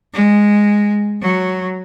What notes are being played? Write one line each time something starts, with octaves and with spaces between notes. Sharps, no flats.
G#3
F#3